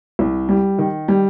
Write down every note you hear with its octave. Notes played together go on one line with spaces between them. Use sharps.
C2
G3
D#3
G3